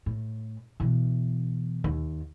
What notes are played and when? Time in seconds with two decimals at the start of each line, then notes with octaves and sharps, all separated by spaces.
0.06 A2
0.80 B2 E3
1.84 D#2